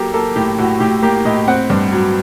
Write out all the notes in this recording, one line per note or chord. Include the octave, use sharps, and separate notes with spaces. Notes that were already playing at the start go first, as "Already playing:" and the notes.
Already playing: F#3 A#3 G4 A4
A#3 A4
A2 G4
A2 F#4
A2 G4
A#3 G4
A2 D#5
C4 F#5
G2
F#3